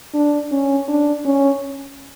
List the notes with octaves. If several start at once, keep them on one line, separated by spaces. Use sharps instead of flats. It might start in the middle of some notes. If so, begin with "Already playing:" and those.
D4
C#4
D4
C#4